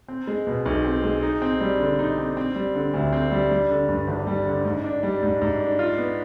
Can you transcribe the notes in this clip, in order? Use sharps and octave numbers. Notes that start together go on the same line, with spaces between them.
C4
G#3
B2
B1
C4
G#3
D#4
C4
G3
D3
D#4
C4
C4
G3
D3
D2
C4
G3
G3
D3
G2
G#1
G3
D3
G#2
D4
G3
G#2
G#2
D4
F4
B3